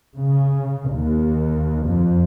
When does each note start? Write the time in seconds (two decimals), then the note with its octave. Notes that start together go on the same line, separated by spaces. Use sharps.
0.19 C#3
0.91 D#2
1.87 F2